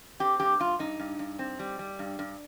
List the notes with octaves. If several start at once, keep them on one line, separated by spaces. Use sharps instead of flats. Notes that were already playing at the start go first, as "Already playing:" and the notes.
C4 G4
G2 G4
G2 F4
G2 D#4
G2
G2
C4
G3
G3
G2
G2